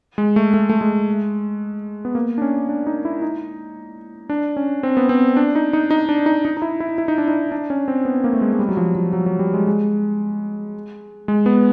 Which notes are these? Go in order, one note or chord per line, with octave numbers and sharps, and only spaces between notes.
G#3
A3
A3
A3
G#3
B3
A#3
D4
C#4
D4
D#4
E4
D#4
D4
C#4
C4
B3
C4
D4
D#4
D#4
D#4
D4
D#4
D#4
D#4
E4
E4
E4
D#4
D4
D#4
D4
C#4
C4
B3
A#3
A3
G#3
G#3
G3
F#3
F3
F3
F#3
F#3
G3
G#3
G#3
G#3
B3